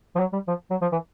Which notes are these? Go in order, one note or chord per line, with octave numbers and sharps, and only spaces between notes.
F3
F#3
G3
F3
F#3
F3
E3